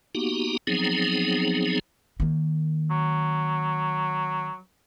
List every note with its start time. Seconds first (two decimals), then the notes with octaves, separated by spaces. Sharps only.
0.15 A#3 B3 D#4 F#4 G4
0.67 F3 F#3 B3 C4 D#4 G#4
2.20 D#3 A#3
2.90 F#3